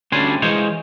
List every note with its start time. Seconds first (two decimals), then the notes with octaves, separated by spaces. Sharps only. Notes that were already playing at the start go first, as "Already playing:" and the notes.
0.12 D2 G3 C#4 D4 G#5 C6
0.42 E3 G#3 F4 C5 C#5